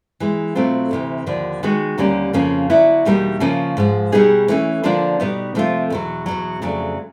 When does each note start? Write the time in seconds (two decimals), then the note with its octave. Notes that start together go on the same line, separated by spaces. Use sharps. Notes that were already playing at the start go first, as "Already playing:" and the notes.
0.20 E3 G#3 B3
0.55 B2 F#3 A3 C4 F4
0.91 D2 C3 E3
1.26 D#2 D3 F3
1.63 D#3 G#3 B3 D#4 F#4
1.98 D#2 D3 G3 A#3 C#4
2.33 F2 C#3 F3 A#3 C#4
2.70 D3 F#3 B3 E4
3.05 E2 B2 G3 A#3 D#4
3.40 C#3 F3 A#3 C#4
3.77 G#2 F3 G#3
4.12 B2 G3 B3 D#4 G#4
4.48 E3 A3 C#4
4.83 D3 F3 A#3 D4 F4
5.20 B2 G3 B3 D#4
5.55 C3 F3 A3 C4 F4
5.90 E2 B2 F#3
6.26 E2 B2 F#3
6.62 F2 C#3 F#3 A3 D4